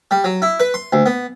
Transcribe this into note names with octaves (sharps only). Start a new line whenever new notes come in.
G3
F#3
E4
B4
C6
D2
B3